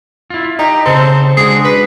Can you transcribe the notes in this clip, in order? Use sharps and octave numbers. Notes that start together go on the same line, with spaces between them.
E4 F4
D#4 G4
C#3 C4 A4
G#3 D4 F#4 G#4
B4